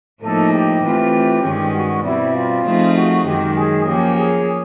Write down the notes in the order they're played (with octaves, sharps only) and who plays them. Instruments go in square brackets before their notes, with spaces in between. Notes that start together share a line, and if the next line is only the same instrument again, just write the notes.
[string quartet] A2 F3 A#3 D#4 [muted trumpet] A4
[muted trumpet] G4
[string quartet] E3 A3 C4 F4
G2 D#3 G#3 C#4
[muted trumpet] F#4
[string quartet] B2 G3 C4 [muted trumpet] E4
[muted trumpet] F4
[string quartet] F3 A3 C4 D#4 G#4
[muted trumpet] F#4
[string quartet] F#2 D#3 G#3 [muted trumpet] G4
[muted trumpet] G#4
[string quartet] F3 A#3 C#4 [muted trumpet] G4
[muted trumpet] G#4